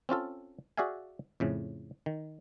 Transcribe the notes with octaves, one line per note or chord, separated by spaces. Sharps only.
C4 C#4 F4 A4
F#4 G#4 D5 E5 F5 G#5
F2 A2 C#3
D#3